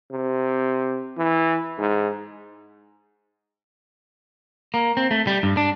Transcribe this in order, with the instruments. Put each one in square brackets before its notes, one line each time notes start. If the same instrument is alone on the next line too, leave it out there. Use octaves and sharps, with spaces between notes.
[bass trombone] C3
E3
G#2
[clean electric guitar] A#3
C4
A3
G3
G2
D4